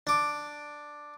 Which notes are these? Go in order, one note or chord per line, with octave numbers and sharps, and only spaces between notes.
D4 D6